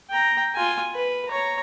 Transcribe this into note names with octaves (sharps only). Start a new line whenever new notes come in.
G5 A#5
F4 G#5
B4
C#5 A#5